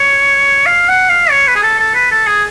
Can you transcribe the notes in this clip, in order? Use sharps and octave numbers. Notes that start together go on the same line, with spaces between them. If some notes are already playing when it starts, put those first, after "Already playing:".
Already playing: C#5
F5
F#5
F5
C#5
B4
G#4
A4
A4
B4
A4
G#4